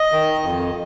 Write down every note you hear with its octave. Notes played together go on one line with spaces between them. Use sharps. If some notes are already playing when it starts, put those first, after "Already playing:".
Already playing: D#5
D#3
F2